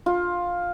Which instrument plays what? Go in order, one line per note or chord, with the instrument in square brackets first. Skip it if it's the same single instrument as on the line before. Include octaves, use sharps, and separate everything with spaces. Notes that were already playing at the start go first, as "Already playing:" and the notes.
[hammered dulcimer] F4